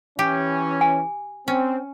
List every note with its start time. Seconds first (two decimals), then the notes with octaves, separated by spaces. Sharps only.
0.19 E3 C#4 G4
0.81 G#5
1.48 C4 C#4